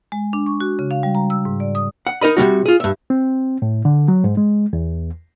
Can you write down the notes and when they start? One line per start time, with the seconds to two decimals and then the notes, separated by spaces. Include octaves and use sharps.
0.12 G#3
0.33 D4
0.46 C#6
0.60 F#4
0.79 C#3
0.91 F5
1.03 G3
1.15 A#5
1.30 E6
1.45 G#2
1.60 D5
1.75 D#6
2.07 F#5
2.21 D#4 A#4 D#5 B5
2.37 C3 D#3 G3 F#4
2.66 F4 G#4
2.80 G2 E5
3.10 C4
3.62 A2
3.85 D3
4.08 F#3
4.24 G#2
4.37 G#3
4.73 E2